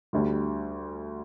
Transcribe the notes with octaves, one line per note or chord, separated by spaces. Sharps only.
D2 D3 G3